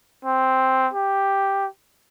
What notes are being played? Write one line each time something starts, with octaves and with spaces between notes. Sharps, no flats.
C4
G4